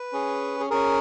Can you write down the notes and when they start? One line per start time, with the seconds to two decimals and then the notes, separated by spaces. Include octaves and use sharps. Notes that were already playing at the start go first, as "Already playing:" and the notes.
Already playing: B4
0.12 C#4 G#4
0.60 G#4
0.70 C#4 G#4 A#4